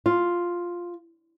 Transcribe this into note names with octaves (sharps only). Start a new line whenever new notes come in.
F4